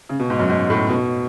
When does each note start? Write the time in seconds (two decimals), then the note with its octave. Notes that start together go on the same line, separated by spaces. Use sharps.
0.09 C#3
0.20 B2
0.30 G#2
0.39 F#2
0.50 G#2
0.70 A2
0.89 B2